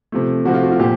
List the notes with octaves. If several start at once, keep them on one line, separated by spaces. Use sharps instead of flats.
C3 F3 A3
C3 F3 A3 F#4
F4
F#4
F4
A#2 F3 G4